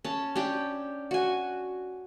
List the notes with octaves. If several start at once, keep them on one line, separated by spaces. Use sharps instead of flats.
C#4 A5
C#4 D4 G4
F#4 G#5